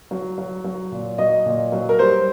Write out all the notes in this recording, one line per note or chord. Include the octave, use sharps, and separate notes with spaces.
F#3
F#3
F#3
A#2
F#3 D#5
A#2
F#3
A#4
G3 C5